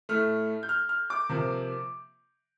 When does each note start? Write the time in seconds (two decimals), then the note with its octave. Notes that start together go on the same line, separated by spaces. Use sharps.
0.09 A2 A3 F6
0.63 G6
0.69 F6
0.89 F6
1.10 D6
1.29 C3 F3 A#3